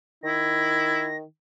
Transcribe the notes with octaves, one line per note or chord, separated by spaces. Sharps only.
D#3 E4 A#6